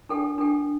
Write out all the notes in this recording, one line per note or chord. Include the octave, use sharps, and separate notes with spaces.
D4 A4 G5
D4 A4 G5